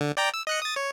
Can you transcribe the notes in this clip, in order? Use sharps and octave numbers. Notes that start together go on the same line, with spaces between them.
D3
D5 G5 A#5
E6
D#5 F#6 C#7
D#6 A6
C#5